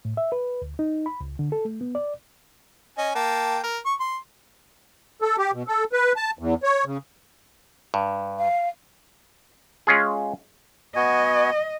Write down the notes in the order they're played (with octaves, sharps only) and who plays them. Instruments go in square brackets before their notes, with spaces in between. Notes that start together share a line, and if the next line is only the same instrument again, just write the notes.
[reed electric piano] A2
E5
B4
D2
D#4
B5
C#2
D3
A4
A3
B3
D5
[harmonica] C#4 D#5 G#5
A#3 G5 A5
A#4
C#6
C6
[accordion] A4
G4
B2
A4
B4
A5
E2
C#5
C#3
[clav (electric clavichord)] G2
[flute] F5
[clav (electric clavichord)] G#3 C#4 F4 G#4
[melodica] B3 F#4 G#5 [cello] D#5